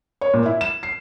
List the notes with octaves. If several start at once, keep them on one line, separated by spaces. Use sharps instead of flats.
C#5
A#2
E4
E7
C7